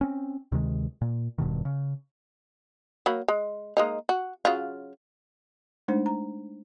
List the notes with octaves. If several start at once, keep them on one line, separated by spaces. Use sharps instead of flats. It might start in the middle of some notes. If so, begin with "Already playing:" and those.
C4 C#4
D2 C3 D#3 G#3
A#2
E1 G2 B2 D#3
C#3
F#3 A#3 B5
G#3
G#3 A#3 D#4
F#4
C#3 F#3 F4
G#3 A3 D4 D#4 C5
A#5